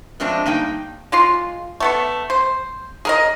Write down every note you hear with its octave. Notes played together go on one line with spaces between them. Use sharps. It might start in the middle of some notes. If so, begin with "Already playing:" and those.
F3 G#3 A3 C4 D4
G2 A#3 D#4 G5
G#3 F4 C6
A3 B3 A4
C5
G#4 A#4 D#5